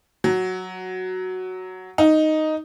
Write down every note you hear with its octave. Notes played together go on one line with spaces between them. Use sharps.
F#3
D#4